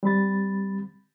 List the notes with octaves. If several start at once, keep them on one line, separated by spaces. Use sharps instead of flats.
G3 C4 B5 A6